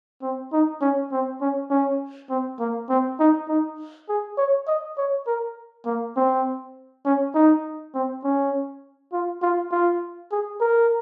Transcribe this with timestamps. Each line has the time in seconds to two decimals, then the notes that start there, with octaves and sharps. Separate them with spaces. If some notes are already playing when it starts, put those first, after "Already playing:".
0.22 C4
0.53 D#4
0.81 C#4
1.12 C4
1.41 C#4
1.70 C#4
2.30 C4
2.59 A#3
2.89 C4
3.20 D#4
3.49 D#4
4.09 G#4
4.37 C#5
4.67 D#5
4.98 C#5
5.27 A#4
5.86 A#3
6.16 C4
7.05 C#4
7.34 D#4
7.94 C4
8.24 C#4
9.13 F4
9.42 F4
9.71 F4
10.32 G#4
10.60 A#4